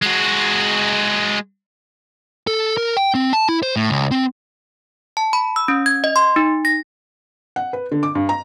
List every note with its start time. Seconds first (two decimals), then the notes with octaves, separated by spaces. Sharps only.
0.02 G#3 F#4
2.47 A4
2.77 A#4
2.97 G5
3.15 C4
3.33 A5
3.49 E4
3.63 C5
3.76 A2
3.90 C#2
4.11 C4
5.17 A5
5.33 B5
5.56 E6
5.68 C#4
5.86 G#6
6.04 D#5
6.16 C6
6.36 D#4
6.65 A#6
7.56 F#5
7.73 B4
7.92 D3
8.03 D6
8.15 G2
8.29 A#5